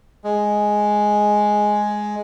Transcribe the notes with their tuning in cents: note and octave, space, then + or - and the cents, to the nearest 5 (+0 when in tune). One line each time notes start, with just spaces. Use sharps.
G#3 +5